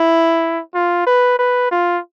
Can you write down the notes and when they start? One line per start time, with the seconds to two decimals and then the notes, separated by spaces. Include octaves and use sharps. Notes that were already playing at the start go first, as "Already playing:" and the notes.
Already playing: E4
0.75 F4
1.07 B4
1.39 B4
1.71 F4